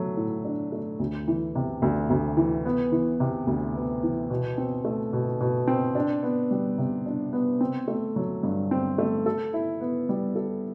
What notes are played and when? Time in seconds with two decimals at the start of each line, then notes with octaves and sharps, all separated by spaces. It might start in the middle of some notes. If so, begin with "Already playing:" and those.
Already playing: F#3 A3
0.17 A2
0.45 D4
0.72 A3
1.00 D2
1.28 E3
1.55 C3
1.82 D2
2.10 D2
2.37 E3
2.66 B3
2.92 E3
3.20 C3
3.47 D2
3.76 B3
4.03 E3
4.30 B2
4.58 C4
4.85 A3
5.13 B2
5.41 B2
5.68 C4
5.95 D4
6.23 B3
6.51 G3
6.78 C3
7.06 D4
7.33 B3
7.61 C4
7.88 A3
8.16 F#3
8.43 G2
8.71 C4
8.98 A3
9.26 A4
9.53 E4
9.81 B3
10.09 G3
10.35 A4